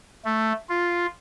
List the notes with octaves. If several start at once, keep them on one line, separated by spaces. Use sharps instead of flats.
A3
F4